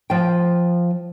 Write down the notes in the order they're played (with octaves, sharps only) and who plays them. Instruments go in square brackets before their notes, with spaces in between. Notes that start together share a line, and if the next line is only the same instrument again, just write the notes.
[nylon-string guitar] F3 G5